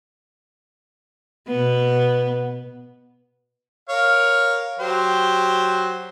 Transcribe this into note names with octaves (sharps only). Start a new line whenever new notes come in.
B2 B3
A#4 C#5 F5
F#3 G4 C5